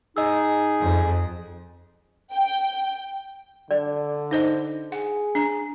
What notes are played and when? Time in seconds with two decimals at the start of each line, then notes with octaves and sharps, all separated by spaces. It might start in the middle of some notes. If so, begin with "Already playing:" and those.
0.16 D#4 G#4 D#5 E6
0.80 F2
2.32 G5
3.71 D3 D5
4.31 D#4 C5 D#5
4.92 G#4 F#5
5.35 D4